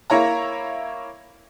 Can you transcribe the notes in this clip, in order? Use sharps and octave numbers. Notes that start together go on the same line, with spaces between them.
A#3 E4 C#5 A#5